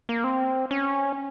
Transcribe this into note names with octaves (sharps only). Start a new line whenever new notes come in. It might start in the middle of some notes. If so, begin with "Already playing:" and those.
A#3
C4
C#4